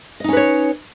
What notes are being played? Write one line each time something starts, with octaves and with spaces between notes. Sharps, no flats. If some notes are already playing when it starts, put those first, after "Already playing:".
C#4 D#4 B4 C#5 D#5